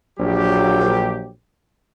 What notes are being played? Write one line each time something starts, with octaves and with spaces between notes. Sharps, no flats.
A#1 F#3 G4